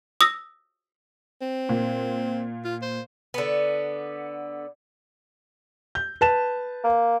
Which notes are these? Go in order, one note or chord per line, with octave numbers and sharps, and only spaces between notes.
D#6 E6 A#6
C4
A#2
F4
C5
D3 B3
G6
B4 A5 E7
A#3